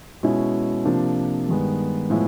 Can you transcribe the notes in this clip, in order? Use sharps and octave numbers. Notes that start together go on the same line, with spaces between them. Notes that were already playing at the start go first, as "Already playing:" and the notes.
B2 G#3 C#4 E4
C3 F3 A#3 D4
G2 D#3 G#3 B3
A2 F3 G#3 B3 E4